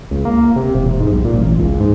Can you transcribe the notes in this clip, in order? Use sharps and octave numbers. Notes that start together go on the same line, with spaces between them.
C#2
A#3
C3
E1
G#2
B1
A#2
A1
C#2
G#2